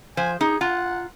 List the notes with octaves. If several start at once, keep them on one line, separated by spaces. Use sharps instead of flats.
F3 C5 G#5
D#4 G#4
F4 F#5 A#5